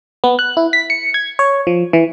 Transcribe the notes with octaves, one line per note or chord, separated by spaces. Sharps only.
B3
F#6
E4
B6
C#7
G#6
C#5
F3
E3